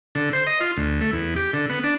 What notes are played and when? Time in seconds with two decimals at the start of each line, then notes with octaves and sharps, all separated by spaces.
0.15 D3
0.33 C5
0.47 D#5
0.60 F4
0.77 D2
1.01 A3
1.13 E2
1.36 G4
1.53 D3
1.69 B3
1.84 D4